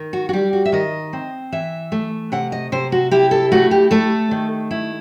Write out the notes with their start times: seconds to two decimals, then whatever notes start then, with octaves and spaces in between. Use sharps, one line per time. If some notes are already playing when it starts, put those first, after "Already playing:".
Already playing: D#3
0.13 F#4
0.29 F#4
0.33 G3 G4
0.53 F#4
0.65 E5
0.72 D#3 D#5
1.13 C4
1.52 E3 E5
1.92 A3
2.32 C3 F#5
2.52 D#5
2.72 C3 C5
2.92 F#4
3.11 E4 G4
3.31 A4
3.52 A3 F#4
3.71 G4
3.91 A3 A4
4.31 D#3
4.71 E4